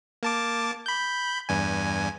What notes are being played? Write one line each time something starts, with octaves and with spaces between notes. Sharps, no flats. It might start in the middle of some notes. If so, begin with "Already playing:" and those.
A#3 A5 D6
B5 G6
E2 G2 G#5